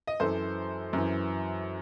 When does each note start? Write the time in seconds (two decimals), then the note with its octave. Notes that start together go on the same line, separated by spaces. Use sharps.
0.07 D#5
0.20 F#2 E3 A4 C5
0.93 F#2 E3